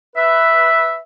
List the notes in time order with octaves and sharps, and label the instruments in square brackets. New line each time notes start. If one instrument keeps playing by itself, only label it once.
[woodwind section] B4 E5